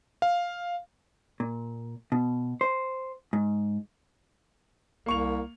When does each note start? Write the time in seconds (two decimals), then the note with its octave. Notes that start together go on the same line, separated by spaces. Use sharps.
0.22 F5
1.40 A#2
2.12 B2
2.61 C5
3.33 G#2
5.06 C2 A#3 C#6 F7